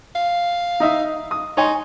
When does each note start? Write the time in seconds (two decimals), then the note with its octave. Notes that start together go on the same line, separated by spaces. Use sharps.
0.15 F5
0.80 D#4 D#5 E5
1.31 D#6
1.57 D#4 C#5 G#5 C6